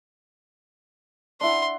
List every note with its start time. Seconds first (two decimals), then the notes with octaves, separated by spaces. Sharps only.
1.41 D4 E4 F#5 C6